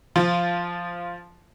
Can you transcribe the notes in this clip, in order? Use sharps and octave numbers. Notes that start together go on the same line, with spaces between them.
F3 F4